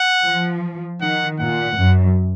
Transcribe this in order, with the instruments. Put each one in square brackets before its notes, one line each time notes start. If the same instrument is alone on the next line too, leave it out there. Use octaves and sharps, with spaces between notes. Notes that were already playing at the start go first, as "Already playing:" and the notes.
Already playing: [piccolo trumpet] F#5
[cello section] F3
[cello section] D#3 [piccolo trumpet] F#5
[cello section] A#2 [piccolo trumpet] F#5
[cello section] F#2